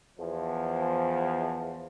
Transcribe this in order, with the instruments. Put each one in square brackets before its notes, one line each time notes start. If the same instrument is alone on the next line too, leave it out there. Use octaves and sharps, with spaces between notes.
[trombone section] E2 F3